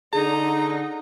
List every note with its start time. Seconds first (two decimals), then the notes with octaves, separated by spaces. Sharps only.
0.13 D3 D#4 G#4 A#5